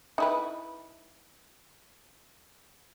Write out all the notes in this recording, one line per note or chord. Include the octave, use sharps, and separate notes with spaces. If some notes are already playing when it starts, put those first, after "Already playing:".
D#4 E4 B4